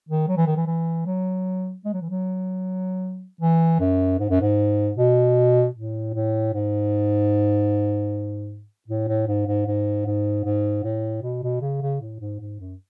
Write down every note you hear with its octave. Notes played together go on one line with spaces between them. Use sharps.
D#3
F#3
E3
D#3
E3
E3
F#3
G#3
F#3
E3
F#3
E3
F#2
G#2
F#2
G#2
B2
A2
A2
G#2
A2
A2
G#2
G#2
G#2
G#2
G#2
A2
B2
B2
C#3
C#3
A2
G#2
G#2
F#2